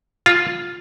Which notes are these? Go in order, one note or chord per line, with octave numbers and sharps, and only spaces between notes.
F4